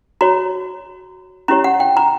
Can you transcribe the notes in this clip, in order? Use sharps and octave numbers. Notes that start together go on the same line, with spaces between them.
F#4 C#5 A#5
C#4 E4 G4 C#5 A#5
F#5
G5
A#5